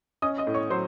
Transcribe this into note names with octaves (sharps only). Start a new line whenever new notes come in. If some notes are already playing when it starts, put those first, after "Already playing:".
C#4 D#5 D#6
D#5 D#6
A2
C#5 C#6
F#3 C5 C6